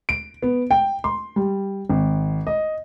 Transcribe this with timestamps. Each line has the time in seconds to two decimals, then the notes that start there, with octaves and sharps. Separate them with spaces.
0.09 D7
0.42 B3
0.71 G5
1.04 C6
1.36 G3
1.90 G#1
2.47 D#5